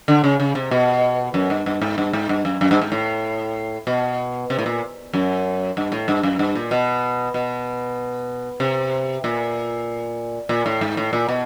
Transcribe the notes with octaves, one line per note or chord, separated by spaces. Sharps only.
D3
C#3
C#3
C3
B2
F#2
G2
G2
G#2
G2
G#2
G2
F#2
F#2
G2
G#2
A2
B2
C3
A2
A#2
F#2
G2
A2
G2
F#2
G2
A#2
B2
B2
C3
A#2
A#2
A2
G#2
A2
A#2
B2